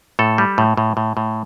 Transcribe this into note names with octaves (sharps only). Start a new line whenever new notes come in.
A2 A4
G3
A2
A2
A2
A2